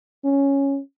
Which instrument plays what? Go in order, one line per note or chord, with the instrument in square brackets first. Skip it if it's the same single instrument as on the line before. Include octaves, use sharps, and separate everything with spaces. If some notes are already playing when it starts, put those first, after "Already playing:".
[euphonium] C#4